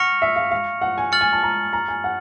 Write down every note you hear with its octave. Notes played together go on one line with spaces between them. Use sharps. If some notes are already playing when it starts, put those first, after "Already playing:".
Already playing: F#5 C#6 F6 A#6 C#7 F7
E5
F5
F5
F#5
G#5
F6 A6 C#7 F#7
G#5
A5
A#5
A#5
G#5
F#5